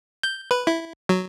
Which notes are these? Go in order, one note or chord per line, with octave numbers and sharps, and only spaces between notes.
G6
B4
E4
F#3